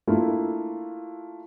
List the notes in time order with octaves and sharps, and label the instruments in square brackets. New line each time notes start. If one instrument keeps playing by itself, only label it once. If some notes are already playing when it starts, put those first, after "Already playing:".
[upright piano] A3 A#3 D4 E4 F4